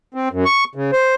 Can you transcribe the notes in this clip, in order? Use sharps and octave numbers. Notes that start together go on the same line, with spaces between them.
C4
F#2
C#6
C#3
C5